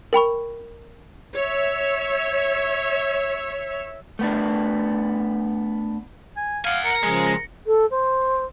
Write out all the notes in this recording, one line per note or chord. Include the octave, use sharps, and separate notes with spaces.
A#4 G5 B5 C#6
C#5 E5
A3 B3 D4
G#5
F5 F#5 G#5
A#4 C#7
C#3 F3 G#3 G#4
A#6
A4
C5